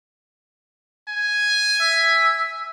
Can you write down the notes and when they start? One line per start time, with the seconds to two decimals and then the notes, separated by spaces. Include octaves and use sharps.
1.09 G#5
1.80 E5